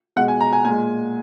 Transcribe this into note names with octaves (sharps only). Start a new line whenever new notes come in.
B2 G#3 F#5
G#5
A#5
G#5
A#2 G#3 G#5